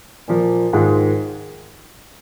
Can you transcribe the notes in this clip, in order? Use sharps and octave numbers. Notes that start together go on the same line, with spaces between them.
A#2 F3 A#3
G#2 D#3 G#3 F4